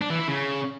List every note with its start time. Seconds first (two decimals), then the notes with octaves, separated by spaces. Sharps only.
0.01 D4
0.10 E3
0.19 E4
0.28 C#3